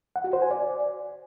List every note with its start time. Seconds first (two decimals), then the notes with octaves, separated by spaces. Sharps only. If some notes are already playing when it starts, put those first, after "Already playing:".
0.16 F#5
0.24 F#4
0.33 C5
0.42 G#5
0.51 D5